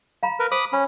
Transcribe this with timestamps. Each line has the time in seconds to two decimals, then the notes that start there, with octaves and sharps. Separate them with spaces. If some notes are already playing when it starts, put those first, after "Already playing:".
0.23 F5 A#5 B5
0.40 A#4 B4
0.52 C5 B5 D6 D#6
0.73 C#4 B5